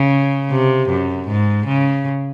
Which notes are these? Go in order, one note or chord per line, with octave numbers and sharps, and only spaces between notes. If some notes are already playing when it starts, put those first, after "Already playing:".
Already playing: C#3
C3
F#2
G#2
C#3